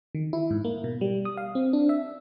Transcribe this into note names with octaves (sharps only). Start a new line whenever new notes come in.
D#3
E4
G#2
A#3
B2
G3
D#6
F5
C4
D4
E5